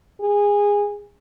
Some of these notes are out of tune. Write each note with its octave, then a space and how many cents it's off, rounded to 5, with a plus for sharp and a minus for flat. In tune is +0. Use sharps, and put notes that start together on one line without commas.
G#4 -20